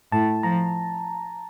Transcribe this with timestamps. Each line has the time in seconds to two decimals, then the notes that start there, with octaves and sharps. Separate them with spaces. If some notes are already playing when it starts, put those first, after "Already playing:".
0.12 A2 A5
0.43 F3 A#5